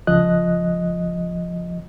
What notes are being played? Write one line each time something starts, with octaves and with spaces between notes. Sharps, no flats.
C#2 F3 D#5 F#6